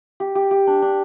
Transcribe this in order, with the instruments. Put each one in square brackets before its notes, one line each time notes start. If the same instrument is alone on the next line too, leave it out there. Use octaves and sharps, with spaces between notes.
[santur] G4
G4
G4
D4
D4